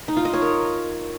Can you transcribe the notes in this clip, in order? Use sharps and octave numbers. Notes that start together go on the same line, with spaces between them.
D#4
F4
D#5
C#5
A#4